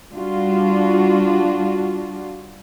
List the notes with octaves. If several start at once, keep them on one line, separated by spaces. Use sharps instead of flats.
G3 D4 F4 F#4